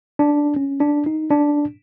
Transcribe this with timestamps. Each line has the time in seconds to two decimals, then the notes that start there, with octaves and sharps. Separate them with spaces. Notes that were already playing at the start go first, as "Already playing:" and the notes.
0.19 D4
0.56 C#4
0.80 D4
1.06 D#4
1.30 D4